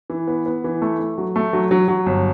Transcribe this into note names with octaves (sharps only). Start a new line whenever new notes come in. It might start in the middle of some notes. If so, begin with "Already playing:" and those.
E3
B3
B3
E3
A3
A3
F#3
A3
F#3
F#3
F#3
G1